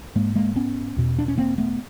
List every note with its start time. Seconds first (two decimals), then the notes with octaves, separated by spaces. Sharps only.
0.15 G#2 G#3 A#3
0.36 G#3 A#3
0.56 B3 C#4
0.97 E2 B2
1.19 D4
1.28 C#4
1.38 A#3 C4
1.58 A3 B3